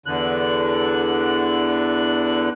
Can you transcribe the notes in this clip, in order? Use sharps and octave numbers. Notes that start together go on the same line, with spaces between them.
E2 D3 F#6